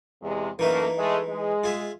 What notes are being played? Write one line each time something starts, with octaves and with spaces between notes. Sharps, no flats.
E2 C3 G#3
F#2 E3 A3 A#3 D#4 B4
G#3 A3
G#3
F4 G#4 E5